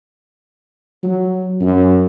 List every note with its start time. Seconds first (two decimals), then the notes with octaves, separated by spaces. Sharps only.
1.03 F#3
1.61 F#2